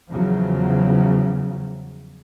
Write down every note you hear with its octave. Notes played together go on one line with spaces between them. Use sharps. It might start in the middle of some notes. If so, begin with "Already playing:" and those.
E2 C#3 F3 F#3